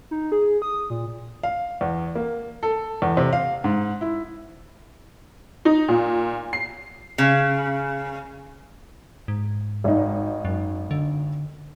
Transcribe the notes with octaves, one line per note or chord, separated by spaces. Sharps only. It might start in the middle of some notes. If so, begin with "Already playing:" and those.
D#4
G#4
D#6
A#2
F5
E2
A#3
A4
E2
C3
F5
G#2
E4
D#4
A#2
C7
C#3
G#2
G#1 D#4
F#2
D3